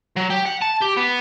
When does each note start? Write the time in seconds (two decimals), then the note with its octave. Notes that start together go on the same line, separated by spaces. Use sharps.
0.16 F#3
0.30 G4
0.46 F#5
0.62 A5
0.82 G4
0.97 B3